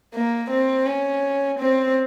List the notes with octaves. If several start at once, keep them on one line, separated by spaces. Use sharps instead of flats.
A#3
C4
C#4
C4